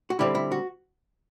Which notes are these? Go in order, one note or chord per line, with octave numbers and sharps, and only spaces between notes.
F#4
D3 G3 C4 E4 G4
E4
F#4